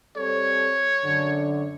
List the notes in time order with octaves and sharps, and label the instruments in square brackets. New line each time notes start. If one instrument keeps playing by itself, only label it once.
[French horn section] G3 C4 A4 [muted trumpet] C#5
[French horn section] F#2 D3